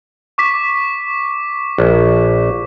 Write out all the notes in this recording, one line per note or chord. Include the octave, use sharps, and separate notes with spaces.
C#6 D6 B6
A#1